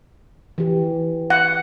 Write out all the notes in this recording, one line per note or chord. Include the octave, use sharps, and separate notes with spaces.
E3 G4
F#5